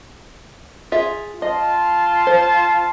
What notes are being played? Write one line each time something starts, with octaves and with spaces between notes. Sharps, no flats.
F4 G#4 E5
F4 D#5 A5 C6
C5